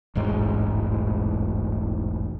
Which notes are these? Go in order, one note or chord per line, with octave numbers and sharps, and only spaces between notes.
E1 A1 G#2